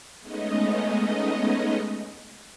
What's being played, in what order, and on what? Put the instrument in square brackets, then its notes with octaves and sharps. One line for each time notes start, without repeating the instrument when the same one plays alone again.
[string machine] G#3 A3 B3 C#4 D#4 D#5